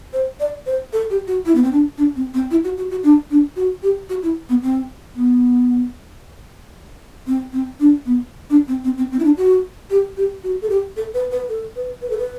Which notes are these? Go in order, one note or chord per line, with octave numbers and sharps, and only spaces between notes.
C5
D5
C5
A4
G4
F#4
E4
B3
C4
D4
D4
C4
C4
E4
F#4
F#4
F#4
D4
D4
F#4
G4
F#4
E4
B3
C4
B3
C4
C4
D4
B3
D4
C4
C4
C4
C4
E4
D4
F#4
G4
G4
F#4
A4
G4
A4
B4
B4
A4
B4
B4
A4
B4